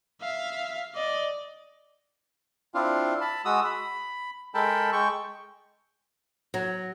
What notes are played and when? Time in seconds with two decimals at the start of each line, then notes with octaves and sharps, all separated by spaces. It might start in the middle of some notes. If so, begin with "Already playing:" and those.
0.21 E5 F5
0.95 D5 D#5
2.74 C4 D4 E4 F4 F5
3.21 A5 B5
3.45 G#3 F#4 D#6 E6
3.64 B5
4.54 G#3 A4 A#4 G5 A5 B5
4.92 G#3 G5 C#6
6.54 F#3